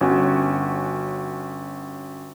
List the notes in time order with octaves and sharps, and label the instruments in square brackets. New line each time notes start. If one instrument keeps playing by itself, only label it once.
[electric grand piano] G1 C#4 F#4 G#5